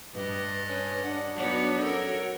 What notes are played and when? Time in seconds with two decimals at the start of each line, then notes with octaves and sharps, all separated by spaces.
0.14 G2 B4 D#5
0.68 C#4
1.03 D4 F#5
1.36 F#3 B3 D#4 F#4 C#5
1.80 C#4 A4 A#4